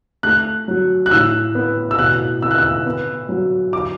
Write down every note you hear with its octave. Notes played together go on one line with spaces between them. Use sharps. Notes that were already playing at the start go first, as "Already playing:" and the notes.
A3 F#6
F#3
F#6
A2 E6
B3
E6
B2 F#6
B3 E6
F#6
E6
B3
F#3
D6